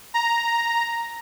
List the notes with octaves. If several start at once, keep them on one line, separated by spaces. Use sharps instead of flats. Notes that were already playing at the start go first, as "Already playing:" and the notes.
A#5